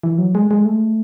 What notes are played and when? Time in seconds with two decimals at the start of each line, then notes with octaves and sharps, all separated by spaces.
0.03 E3
0.18 F#3
0.35 G#3
0.51 G#3
0.65 A3